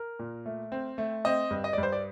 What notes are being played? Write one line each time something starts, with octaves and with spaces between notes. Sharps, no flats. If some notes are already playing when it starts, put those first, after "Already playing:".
Already playing: A#4
A#2
A3
C4
A3
C4 D#5
G2
D#5
D5
G2 C5
D5